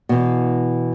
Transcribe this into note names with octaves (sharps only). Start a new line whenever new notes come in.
B2 E3